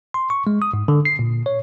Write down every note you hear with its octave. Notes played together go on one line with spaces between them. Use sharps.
C6
C#6
G#3
D#6
G#2
D3
C7
A#2
C#5